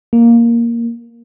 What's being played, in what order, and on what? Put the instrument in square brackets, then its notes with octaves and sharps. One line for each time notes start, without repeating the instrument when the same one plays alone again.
[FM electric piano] A#3